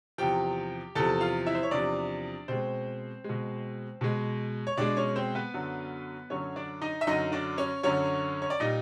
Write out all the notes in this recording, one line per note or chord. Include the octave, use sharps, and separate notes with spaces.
E2 C3 F3 G4 G5
E2 C3 F3 A4 A5
F4 F5
E4 E5
C5
C#5
E2 C3 F3 D4 D5
B2 G#3 C4 C5
B2 G#3
B2 G#3
C#5
B2 G#3 D4 D5
C#4 C#5
C4 C5
B3 B4
F#2 D3 F#3
F#2 D3 F#3 C#4 C#5
D4 D5
D#4 D#5
E5
F#2 D3 F#3 D#4 D#5
D4 D5
C#4 C#5
F#2 D3 F#3 C#4 C#5
C#5
D5
A#2 G3 D#4 D#5